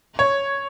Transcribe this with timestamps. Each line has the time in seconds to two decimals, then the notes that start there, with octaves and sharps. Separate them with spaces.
0.19 C#5